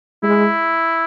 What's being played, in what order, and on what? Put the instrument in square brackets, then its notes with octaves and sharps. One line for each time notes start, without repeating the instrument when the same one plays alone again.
[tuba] G#3 [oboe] E4